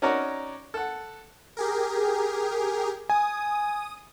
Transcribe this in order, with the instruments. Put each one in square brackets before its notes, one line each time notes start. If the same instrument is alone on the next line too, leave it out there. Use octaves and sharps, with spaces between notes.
[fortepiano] C#4 D#4 F#4 A#4 C#5 D5
A4 F#5
[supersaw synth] G4 G#4 A#4
[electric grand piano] G#5 [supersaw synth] D#6